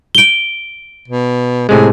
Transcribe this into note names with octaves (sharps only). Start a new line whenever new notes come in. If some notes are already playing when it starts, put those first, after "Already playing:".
D7 G7
B2
A2 C3 G#3 G#4